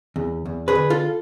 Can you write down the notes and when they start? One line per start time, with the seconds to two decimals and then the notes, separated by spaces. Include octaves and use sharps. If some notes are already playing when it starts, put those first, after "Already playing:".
0.16 E2
0.46 E2
0.68 G#4 B4
0.75 D3
0.90 F4 A4